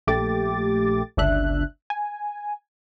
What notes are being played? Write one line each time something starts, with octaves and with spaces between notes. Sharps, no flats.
A#1 A3 G4 D6 A6
G1 C#2 D4 E5 F#6
G#5